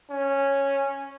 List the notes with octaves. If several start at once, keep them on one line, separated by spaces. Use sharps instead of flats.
C#4